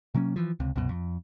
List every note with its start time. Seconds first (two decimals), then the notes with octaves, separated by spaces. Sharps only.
0.15 C3 F#3 A#3 C#4
0.36 E3 F3
0.60 C#2 C3
0.76 C2 F#2 B2
0.89 F2